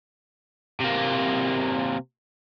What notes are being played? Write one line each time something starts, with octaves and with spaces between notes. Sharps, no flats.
C3 A#3